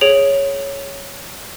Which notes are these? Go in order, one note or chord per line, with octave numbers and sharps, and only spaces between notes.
G#4 C#5 D7 F7 F#7